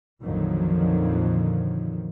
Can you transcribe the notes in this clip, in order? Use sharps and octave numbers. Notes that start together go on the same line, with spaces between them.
A#1 F2 D3 D#3 F3 F#3